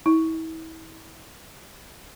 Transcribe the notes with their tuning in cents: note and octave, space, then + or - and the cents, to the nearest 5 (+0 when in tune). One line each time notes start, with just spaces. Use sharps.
E4 -35